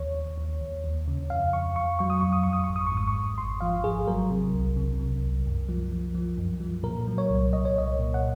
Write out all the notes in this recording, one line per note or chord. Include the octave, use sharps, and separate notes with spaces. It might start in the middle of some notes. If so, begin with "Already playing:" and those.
Already playing: D#2 C#5
D#2
D#2
D#2
D#2
C#3
F2 F5
F2 C#6
F2 C#6
F#3 C#6
D#6
F2 C#6
D#6
F2 C#6
D#6
G#1 C#6
D#6
C#6
G#2
D#6
C#6
G#1
G#1 C6
F3 F5
G#1 G#4
F#3 A#4
C3
C2
C3
C3
C2
F#2
F3
F3
F3
F#2
F3
A#2 A#4
F#3
C#5
C2
C2 D#5
C#5
C2 D#5
A#2
F#5